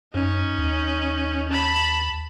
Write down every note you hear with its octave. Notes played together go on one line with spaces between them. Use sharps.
F#2 C#4 D#4
D#2
A5 B5